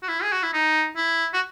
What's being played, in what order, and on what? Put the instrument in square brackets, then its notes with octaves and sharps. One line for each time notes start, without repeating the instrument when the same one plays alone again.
[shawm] F#4
E4
G#4
F#4
E4
D#4
E4
F#4